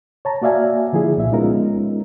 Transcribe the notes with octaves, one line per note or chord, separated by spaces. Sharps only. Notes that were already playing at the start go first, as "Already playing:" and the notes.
C#5 A5 A#5
A#3 F#4 D5 E5 F5 G#5
D3 F3 E4 G#4
C2 A#2 E5
G#3 B3 C#4 D#4 F4 A#4